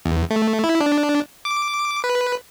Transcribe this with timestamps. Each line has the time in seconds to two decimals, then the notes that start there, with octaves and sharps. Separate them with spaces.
0.05 E2
0.30 A3
0.64 E4
0.80 D4
1.45 D6
2.04 B4